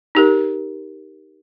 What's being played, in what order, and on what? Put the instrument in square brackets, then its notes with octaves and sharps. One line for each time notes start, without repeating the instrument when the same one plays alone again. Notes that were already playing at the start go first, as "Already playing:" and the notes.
[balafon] D#4 G4 A#4